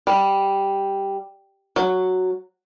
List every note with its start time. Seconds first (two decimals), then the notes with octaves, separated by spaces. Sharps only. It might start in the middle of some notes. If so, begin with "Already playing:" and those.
0.07 G3
1.76 F#3